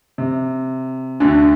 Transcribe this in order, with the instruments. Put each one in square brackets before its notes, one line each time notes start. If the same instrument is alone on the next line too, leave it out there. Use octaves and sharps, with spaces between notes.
[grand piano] C3
D2 D3